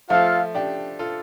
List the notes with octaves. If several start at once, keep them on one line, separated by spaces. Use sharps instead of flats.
F3 A3 F4 A4 F5
D4 G4
F4 A4